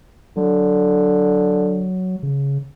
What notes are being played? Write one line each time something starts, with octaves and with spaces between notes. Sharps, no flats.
D3 F#3
C#3